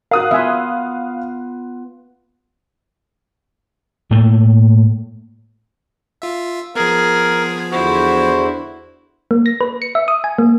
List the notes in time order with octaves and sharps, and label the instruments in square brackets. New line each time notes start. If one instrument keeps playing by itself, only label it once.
[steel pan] F#4 A#4 [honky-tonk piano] F5 D#6 F#6
[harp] B3 F4 [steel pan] E5 G#5
[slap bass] A2 A3 A#3
[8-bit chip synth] F4 E5
[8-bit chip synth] F3 B3 [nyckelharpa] G#4 [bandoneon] A#4
[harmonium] E2 D3 C5 [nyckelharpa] E4 [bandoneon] F#4
[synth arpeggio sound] A#3
A#6
B4
C#7
E5
D#6
G#5
A#3